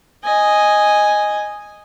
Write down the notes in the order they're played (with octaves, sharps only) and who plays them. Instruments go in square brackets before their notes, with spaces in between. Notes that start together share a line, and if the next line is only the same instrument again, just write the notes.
[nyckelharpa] D#5 G#5